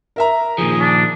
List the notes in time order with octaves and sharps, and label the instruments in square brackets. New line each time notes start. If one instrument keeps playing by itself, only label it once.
[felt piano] A#4 E5 A#5
[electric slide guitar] A#2 D#3 F3 [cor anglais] G#4
[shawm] D4